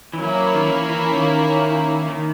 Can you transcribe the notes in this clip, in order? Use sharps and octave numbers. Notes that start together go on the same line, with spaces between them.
E3
F#3 A#3 C#4 E4
D#3
E3
E3
D#3
D#3